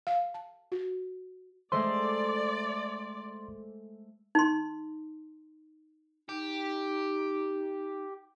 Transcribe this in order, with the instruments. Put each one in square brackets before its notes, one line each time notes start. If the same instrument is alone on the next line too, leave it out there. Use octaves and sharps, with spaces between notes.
[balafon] F5
A5
F#4
[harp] G#3 A3 C5 [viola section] D5 [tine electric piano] C6
[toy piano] D#4 C6
[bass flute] D#4 [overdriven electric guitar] G4